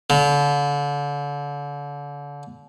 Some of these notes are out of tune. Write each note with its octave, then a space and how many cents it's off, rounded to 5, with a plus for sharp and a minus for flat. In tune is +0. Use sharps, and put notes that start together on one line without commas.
D3 -35